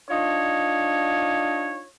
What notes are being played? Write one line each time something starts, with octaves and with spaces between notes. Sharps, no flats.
D4 D#4 F4 C#5